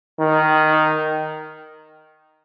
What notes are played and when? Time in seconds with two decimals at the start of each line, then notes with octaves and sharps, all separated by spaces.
0.19 D#3